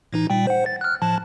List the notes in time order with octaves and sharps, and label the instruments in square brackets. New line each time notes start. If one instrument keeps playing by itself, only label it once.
[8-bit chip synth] A2 E3 D#4
A#2 G3 G5
C5 F#5
A6
F6 F#6
A2 F3 A5